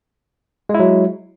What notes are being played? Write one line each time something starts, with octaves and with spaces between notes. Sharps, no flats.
F#3 G#3 E4